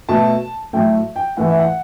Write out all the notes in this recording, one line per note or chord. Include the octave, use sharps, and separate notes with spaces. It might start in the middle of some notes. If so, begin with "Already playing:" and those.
B2 A3 A5
A2 F#3 A3 G5
G5
A2 E3 A3 F#5
E5
F#5